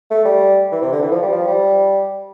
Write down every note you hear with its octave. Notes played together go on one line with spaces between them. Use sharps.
A3
G3
E3
C3
D3
E3
F3
G3
F3
G3